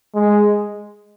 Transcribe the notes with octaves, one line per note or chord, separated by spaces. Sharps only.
G#3